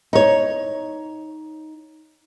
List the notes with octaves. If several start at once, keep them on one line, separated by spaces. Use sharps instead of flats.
D#4 C#5